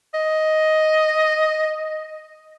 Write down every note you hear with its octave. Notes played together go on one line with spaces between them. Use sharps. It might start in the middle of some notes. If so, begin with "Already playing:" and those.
D#5